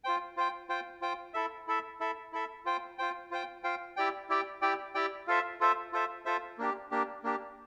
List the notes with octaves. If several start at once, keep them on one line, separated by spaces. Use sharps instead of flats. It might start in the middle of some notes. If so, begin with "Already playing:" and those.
F4 C5 G5
F4 C5 G5
F4 C5 G5
F4 C5 G5
E4 A4 E5
E4 A4 E5
E4 A4 E5
E4 A4 E5
F4 C5 G5
F4 C5 G5
F4 C5 G5
F4 C5 G5
E4 G4 D5 G5
E4 G4 D5 G5
E4 G4 D5 G5
E4 G4 D5 G5
F4 A4 C5 E5
F4 A4 C5 E5
F4 A4 C5 E5
F4 A4 C5 E5
A#3 D4 G4
A#3 D4 G4
A#3 D4 G4